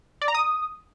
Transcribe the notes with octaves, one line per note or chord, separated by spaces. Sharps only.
D5
A#5
D#6